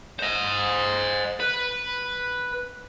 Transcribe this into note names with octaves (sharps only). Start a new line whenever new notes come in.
C5 D#5
B4